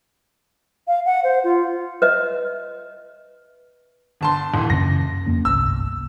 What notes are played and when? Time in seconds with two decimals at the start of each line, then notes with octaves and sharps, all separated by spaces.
0.87 F5
1.06 F#5
1.24 C5
1.44 F4
2.02 B4 D#5 E5
4.21 G1 A5 C6
4.54 D#1 E3
4.70 F#2 C#3 C#4 A#6
5.26 F2 A#3 C#4
5.45 G1 C2 E6